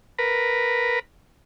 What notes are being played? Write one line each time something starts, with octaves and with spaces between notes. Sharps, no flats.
A#4 B4